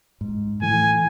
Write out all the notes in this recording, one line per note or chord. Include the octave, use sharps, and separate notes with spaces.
G#2
A2 E3 A3 G#5